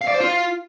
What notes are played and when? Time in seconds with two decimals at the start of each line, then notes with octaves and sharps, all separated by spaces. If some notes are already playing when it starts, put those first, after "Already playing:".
0.01 F5
0.08 D5
0.14 C5
0.21 F4